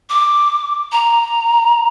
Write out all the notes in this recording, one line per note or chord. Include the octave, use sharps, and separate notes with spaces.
D6
A#5